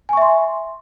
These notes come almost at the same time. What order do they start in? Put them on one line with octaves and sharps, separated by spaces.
G#5 C#6 E5 C6